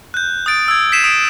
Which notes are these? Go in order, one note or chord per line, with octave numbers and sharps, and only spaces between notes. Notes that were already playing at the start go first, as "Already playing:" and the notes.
F#6 G6
D#6 F#6 A6 D7
E6 G#6
G#6 B6 C7 D#7 E7
D#6 D7